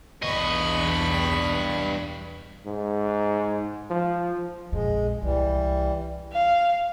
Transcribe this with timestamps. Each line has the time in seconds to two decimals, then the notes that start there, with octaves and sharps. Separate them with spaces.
0.22 B1 E2 G2 D#5 B5 C#6
2.66 G#2
3.90 F3
4.72 A#1 F2 G#3
5.22 C2 E3 G3
6.33 F5